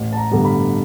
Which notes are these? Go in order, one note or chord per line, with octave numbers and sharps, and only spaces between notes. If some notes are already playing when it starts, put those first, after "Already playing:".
Already playing: A1
A5
A#5
G2 D3 G3 B3
B5